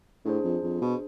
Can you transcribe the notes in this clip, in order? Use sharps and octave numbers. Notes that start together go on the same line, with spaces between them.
A2 D4 G#4 C5
F2
F2
B2